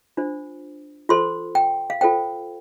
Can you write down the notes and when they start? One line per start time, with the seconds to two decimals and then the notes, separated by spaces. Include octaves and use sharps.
0.17 D4 F4 C5
1.09 F4 A4 C5 C6
1.55 G5
1.90 F5
2.01 F4 A4 C5 G5